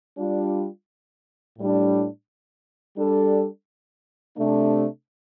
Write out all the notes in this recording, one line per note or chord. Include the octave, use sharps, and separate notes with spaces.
G3 D4 F4
A2 G3 D4
G3 D4 A4
C3 A3 D4